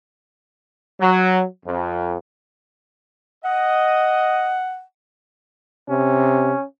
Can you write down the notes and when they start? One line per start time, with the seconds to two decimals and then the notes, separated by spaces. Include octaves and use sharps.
1.01 F#3
1.66 F2
3.45 D#5 F#5
5.89 C3 C#4